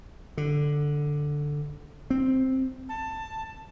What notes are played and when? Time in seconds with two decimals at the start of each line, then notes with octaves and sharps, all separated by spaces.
0.37 D3
2.10 C4
2.89 A5